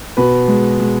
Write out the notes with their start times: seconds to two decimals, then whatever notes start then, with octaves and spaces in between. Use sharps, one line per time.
0.17 B2 B4
0.48 G#3
0.80 G#3